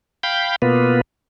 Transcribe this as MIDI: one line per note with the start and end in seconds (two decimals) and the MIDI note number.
0.23 0.56 77
0.23 0.56 79
0.23 0.56 83
0.23 0.56 91
0.62 1.01 47
0.62 1.01 58
0.62 1.01 59
0.62 1.01 65
0.62 1.01 71